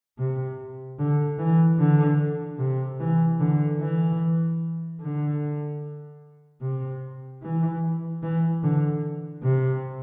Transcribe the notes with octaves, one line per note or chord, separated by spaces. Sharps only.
C3
D3
E3
D3
C3
E3
D3
E3
D3
C3
E3
E3
D3
C3